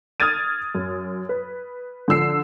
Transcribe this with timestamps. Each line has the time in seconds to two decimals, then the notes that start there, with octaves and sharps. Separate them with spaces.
0.20 D#6 F6 G#6 A6 D#7
0.75 F#2
1.29 B4
2.08 D3 F3 E6 C7